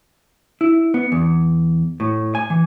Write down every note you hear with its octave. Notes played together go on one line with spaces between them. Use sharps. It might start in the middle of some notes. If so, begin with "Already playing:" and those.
E4
B3
E2
A2
G#5
E3